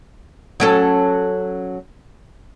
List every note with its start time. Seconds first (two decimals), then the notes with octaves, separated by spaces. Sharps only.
0.60 F#3 C#4 A4